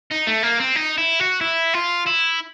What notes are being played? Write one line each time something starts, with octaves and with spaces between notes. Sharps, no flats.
D#4
A3
A#3
C4
D#4
E4
F#4
E4
F4
E4